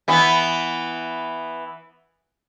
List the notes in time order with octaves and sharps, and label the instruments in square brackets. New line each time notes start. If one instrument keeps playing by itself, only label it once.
[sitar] E3 B3